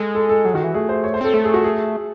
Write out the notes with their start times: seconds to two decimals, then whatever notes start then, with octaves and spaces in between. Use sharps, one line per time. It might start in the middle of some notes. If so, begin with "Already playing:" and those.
Already playing: G#3 A4
0.15 A4
0.29 A4
0.45 F#3 G#4
0.54 D#3 F#4
0.64 E3
0.74 A3 G#4
0.89 C5
1.04 C#5
1.14 C5
1.21 C4 A4
1.34 A3 A4
1.44 G#4
1.54 F#4
1.64 G#4